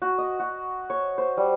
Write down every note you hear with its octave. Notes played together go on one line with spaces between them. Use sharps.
F#4
D#5
F#4
C#5
C5
G3